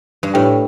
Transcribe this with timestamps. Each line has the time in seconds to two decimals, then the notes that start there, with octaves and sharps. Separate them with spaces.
0.23 G2
0.34 A2 D4 G4 B4 G5